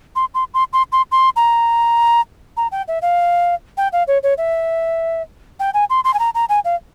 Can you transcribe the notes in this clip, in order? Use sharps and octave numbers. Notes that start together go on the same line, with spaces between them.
C6
C6
C6
C6
C6
C6
A#5
A#5
G5
E5
F5
G5
F5
C#5
C#5
E5
G5
G#5
C6
C6
G#5
A#5
A#5
G#5
F5